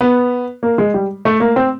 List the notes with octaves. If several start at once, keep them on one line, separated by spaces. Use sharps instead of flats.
B3
A#3
G#3
G3
A3
A#3
C4